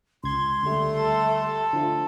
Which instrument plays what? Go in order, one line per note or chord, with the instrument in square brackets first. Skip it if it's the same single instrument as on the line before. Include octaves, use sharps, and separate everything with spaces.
[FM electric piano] C#2 G#6 [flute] C6
[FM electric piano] D2 G3 [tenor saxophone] A3
[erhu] A4
[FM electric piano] D3 F3 A3